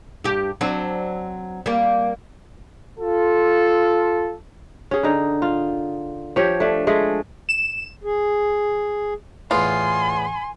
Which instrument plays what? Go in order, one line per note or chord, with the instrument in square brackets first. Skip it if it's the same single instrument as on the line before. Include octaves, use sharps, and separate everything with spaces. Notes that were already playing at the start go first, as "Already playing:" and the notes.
[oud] G2 G4
F#3 C4 D4
G3 A#3
[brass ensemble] F4 A4
[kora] C#4 G#4
D3 D#4
F4
F3 G4 C#5
A3 D4
G#3 A3 G#4
[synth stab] E7
[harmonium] G#4
[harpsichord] E2 A2 B3 [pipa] F4 [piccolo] G#5 [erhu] C6